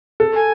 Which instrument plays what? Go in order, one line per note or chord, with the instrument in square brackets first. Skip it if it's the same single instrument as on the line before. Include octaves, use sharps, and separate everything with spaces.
[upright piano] A4
[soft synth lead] G#5